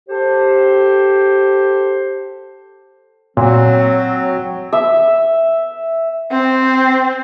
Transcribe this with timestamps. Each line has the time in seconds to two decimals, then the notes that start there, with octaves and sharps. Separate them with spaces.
0.09 G4 A4 C5
3.37 A#2 F#3 C4
4.73 E5
6.31 C4